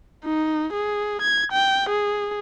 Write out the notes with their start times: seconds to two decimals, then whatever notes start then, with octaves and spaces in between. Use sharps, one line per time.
0.25 D#4
0.73 G#4
1.22 G#6
1.53 G5
1.90 G#4